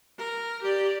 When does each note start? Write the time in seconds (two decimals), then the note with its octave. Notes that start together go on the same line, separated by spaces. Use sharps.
0.18 A#4
0.62 G4 D5